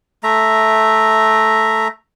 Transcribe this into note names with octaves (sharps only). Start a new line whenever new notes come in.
A3 E5 A#5